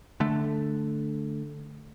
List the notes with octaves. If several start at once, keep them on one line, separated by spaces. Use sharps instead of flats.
D3 A3